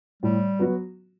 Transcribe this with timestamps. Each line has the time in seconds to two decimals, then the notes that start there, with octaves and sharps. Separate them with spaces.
0.23 A2 G3
0.59 F#3 B3 F#4